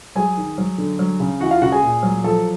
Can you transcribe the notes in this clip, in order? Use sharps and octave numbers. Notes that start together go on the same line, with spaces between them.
F#3 G#4 G#5
D#3
F#3
D3
F#3
C#3
E3 F#4 F#5
F4 F5
C#3 F#4 F#5
G#4 G#5
A#2
F#3
F3 A4 A5